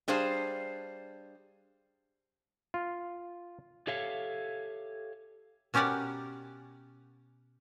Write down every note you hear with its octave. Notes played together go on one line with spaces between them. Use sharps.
G3 D4 G#4 C5 F5 A5
F4
G4 A4 C#5 E5 F5
B2 C#4 G4 A#4 D5 F#5